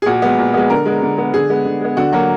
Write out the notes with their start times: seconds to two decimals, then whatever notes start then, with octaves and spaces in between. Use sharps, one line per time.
0.02 G#4
0.06 A#2 F#4
0.22 G#3 B3
0.38 A#2
0.54 G#3 B3
0.70 D3 A#4
0.86 G#3 B3
1.02 D3
1.17 G#3 B3
1.33 D3 G#4
1.49 G#3 B3
1.65 D3
1.80 G#3 B3
1.97 D3 F#4
2.12 F#3 A#3 F#4